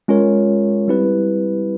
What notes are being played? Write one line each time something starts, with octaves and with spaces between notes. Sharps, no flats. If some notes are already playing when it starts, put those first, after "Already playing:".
G#3 C#4 F4 A#4 C#5
G3 C4 E4 G4 B4